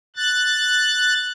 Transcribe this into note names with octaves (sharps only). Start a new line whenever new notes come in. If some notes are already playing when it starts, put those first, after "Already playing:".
F#6 A6